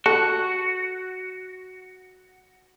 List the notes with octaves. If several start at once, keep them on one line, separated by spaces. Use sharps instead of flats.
F#4 A4